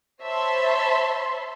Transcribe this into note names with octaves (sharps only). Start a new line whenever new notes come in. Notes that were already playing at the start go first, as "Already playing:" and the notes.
C5 C#5 E5 A5 B5 C6